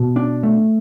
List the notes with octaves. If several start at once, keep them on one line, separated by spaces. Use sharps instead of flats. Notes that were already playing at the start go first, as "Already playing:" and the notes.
Already playing: B2
D4
A3